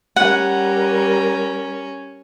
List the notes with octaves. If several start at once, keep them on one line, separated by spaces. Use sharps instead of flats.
G3 C#4 A#4 F#5